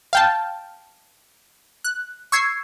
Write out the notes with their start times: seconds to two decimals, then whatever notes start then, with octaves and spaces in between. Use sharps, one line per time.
0.13 F5 G5 A5
1.84 F#6
2.32 C#6 E6 G#6 C7